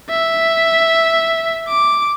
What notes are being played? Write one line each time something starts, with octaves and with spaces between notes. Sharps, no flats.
E5
D6